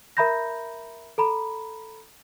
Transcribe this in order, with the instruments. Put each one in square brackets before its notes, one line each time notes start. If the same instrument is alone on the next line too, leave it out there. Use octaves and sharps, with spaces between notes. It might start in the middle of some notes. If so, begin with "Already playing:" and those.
[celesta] A#4 E5 A#5 B5 G6 A#6
A4 A#5 B5